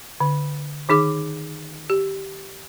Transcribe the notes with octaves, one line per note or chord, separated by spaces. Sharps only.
D3
D#3 D#4 G#4 D6
G4